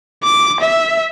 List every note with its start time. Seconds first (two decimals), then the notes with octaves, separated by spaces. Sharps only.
0.24 D6
0.61 E5